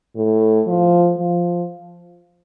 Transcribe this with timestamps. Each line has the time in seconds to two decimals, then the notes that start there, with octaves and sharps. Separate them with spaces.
0.16 A2
0.67 F3
1.18 F3